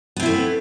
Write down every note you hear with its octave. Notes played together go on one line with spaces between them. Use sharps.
A3 B3 C4 E4